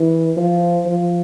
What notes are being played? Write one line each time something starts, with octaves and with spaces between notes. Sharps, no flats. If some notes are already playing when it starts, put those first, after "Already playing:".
Already playing: E3
F3
F3